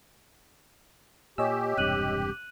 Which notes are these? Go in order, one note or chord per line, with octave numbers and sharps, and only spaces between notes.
A#2 G4 C#5 D#5 G#5 E6
E1 G2 C3 F#6 D#7 F#7